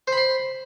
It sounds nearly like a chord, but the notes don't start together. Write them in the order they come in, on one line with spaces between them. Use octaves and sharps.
C5 B5 C6